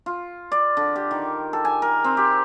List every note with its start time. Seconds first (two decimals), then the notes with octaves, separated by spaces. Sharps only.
0.06 F4
0.52 D5
0.77 D3
0.96 G4
1.11 D#3
1.53 A4
1.65 G#5
1.82 A#4
2.04 C4
2.17 G4